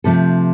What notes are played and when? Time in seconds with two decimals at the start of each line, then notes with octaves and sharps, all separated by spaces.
0.04 C3 F3 A3 A4